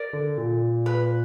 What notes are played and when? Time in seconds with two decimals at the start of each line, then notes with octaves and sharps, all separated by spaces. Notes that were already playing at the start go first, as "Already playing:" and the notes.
Already playing: A#4 D5
0.13 D3
0.38 A#2
0.86 B4